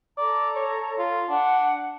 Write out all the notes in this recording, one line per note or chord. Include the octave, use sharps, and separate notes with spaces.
A4 D5 A#5
C#5
F4
D4 F#5